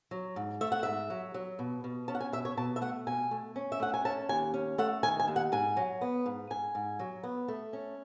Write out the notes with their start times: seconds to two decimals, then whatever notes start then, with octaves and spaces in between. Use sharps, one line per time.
0.11 F#3
0.36 G#2
0.61 A3 E5
0.72 F#5
0.83 G#2 E5
1.10 F#3
1.34 F#3
1.59 B2
1.84 B2
2.08 C#4 A5
2.15 F#5
2.21 G#5
2.33 B2 E5
2.45 C#5
2.57 B2 A5
2.76 E5
2.81 A3 F#5
3.07 B2 G#5
3.31 A3
3.56 C#4
3.72 E5
3.80 A3 F#5
3.94 G#5
4.05 C#4 A5
4.29 D#2 G#5
4.54 C#4
4.78 A3 F#5
5.03 D#3 G#5
5.20 G#5
5.28 D#2
5.36 F#5
5.52 G#2 G#5
5.77 F#3
6.01 B3
6.26 G#2
6.50 G#2 G#5
6.75 G#2
6.99 F#3
7.23 B3
7.48 A3
7.73 C#4